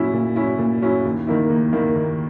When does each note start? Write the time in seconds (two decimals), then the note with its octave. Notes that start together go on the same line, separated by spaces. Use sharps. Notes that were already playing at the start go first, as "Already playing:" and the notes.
Already playing: A#2 F#3 C#4 E4
0.13 A#2
0.36 F#3 C#4 E4
0.59 A#2
0.82 F#3 C#4 E4
1.05 D#2
1.27 D#3 A#3 E4
1.50 D#2
1.73 D#3 A#3 E4
1.96 D#2